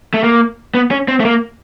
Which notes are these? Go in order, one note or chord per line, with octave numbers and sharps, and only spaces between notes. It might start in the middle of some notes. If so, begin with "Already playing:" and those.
A3
A#3
B3
C#4
C4
A3
A#3